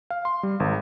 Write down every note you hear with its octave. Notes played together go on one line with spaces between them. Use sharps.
F5
C6
G3
G#1